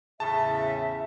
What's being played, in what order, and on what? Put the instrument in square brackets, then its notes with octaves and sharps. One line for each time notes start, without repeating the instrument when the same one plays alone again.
[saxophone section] E2 A2 C#3 [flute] E5 [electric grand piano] A5